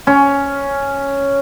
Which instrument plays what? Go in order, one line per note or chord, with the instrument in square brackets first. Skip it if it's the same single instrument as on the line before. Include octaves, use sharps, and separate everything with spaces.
[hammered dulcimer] C#4